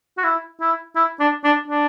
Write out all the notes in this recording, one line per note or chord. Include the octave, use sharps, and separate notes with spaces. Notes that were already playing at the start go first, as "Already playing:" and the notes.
F#4
E4
E4
E4
D4
D4
D4